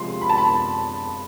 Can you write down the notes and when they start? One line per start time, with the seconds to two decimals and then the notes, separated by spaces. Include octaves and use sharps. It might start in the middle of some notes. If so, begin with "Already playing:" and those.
Already playing: C3 F3 G#3 C4 C6
0.22 B5
0.29 A5
0.38 B5